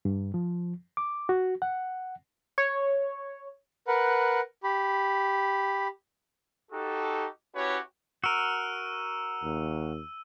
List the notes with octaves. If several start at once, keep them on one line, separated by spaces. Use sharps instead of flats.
G2
F3
D6
F#4
F#5
C#5
A#4 B4 F#5
G4 B5
D#4 F#4 G4 A4
C#4 E4 F#4 G4 B4 C#5
F#4 A#4 E6 D#7
D#2